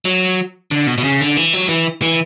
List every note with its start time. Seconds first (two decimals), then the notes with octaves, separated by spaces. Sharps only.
0.05 F#3
0.71 D3
0.87 B2
0.98 B2
1.04 C#3
1.21 D3
1.37 E3
1.54 F#3
1.69 E3
2.02 E3